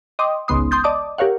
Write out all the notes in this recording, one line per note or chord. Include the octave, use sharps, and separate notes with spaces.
D#5 G5 C6 D6 D#6
G#1 C#2 C#3 B3 C6 D#6
C6 D#6 G6 A6
D5 D#5 A5 D6 D#6
G4 A#4 C#5 F5 F#5